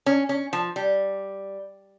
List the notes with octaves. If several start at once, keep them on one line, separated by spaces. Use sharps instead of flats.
C#4
C#4
F3
G3